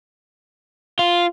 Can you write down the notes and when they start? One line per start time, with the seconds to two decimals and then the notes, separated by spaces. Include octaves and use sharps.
0.99 F4